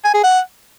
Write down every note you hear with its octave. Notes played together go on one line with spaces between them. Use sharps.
G#5
G#4
F#5